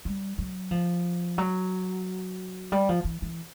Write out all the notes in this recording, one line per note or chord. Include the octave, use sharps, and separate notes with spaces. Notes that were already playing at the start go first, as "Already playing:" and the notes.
G3
F#3
F3
F#3
G3
F3
E3
E3